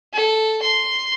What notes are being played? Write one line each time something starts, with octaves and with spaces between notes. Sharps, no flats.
A4
C6